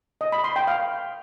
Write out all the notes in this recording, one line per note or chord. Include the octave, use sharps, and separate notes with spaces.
D#5
B5
C6
G5
F5